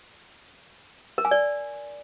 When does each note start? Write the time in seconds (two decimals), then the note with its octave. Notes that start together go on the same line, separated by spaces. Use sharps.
1.18 A#4
1.25 G#5
1.31 D5